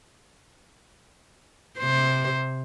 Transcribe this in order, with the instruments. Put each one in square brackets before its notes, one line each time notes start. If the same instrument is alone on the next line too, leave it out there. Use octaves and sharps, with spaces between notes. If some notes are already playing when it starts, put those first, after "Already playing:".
[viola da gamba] C3 C5